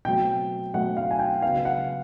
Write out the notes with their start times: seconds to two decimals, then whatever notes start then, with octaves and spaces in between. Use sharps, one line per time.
0.05 B2 F#3 A3 C4 G5
0.74 B2 F#3 A3 C4 F#5
0.97 F5
1.11 G#5
1.19 G5
1.42 C#3 F#3 B3 F5
1.65 F#5